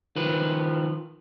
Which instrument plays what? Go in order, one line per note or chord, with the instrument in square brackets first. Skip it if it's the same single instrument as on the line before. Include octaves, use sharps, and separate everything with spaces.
[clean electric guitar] D#3 F3 B4